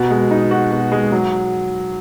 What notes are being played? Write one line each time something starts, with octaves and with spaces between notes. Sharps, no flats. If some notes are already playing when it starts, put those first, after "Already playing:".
Already playing: B2
G#3
D#4
F#4
B2
G#3
F#3